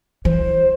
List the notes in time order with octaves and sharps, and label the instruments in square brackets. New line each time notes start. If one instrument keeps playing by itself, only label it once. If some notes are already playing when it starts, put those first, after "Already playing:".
[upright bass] E3 [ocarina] C5